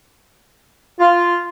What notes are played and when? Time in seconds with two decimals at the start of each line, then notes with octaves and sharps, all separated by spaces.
1.00 F4